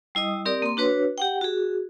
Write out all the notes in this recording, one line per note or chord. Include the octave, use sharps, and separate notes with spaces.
G3 E4 D#5 D#6
C4 G4 A#4 D5 D#6
A#3 C6
D4 F#4 B4 C#5
G4 F#5 G5
F#4 G#4